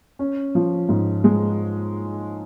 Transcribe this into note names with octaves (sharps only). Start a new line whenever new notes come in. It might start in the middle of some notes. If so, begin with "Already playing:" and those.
C#4
F3
G#2
G#3